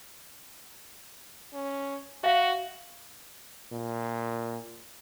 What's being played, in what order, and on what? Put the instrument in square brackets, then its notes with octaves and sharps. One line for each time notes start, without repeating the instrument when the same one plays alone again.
[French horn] C#4
[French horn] F#4 [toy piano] E5 F5
[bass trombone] A#2